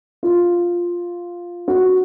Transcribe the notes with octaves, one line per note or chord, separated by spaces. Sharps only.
F4
F#4